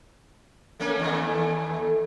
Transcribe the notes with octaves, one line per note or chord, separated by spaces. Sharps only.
A3 A#3 C#4
D#2 A3